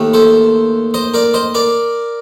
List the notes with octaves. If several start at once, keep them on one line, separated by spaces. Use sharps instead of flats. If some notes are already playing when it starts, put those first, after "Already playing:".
Already playing: D#2 D#3 A3
A4 C5
C5 D#5
A#4 D5
C5 D#5
A#4 D5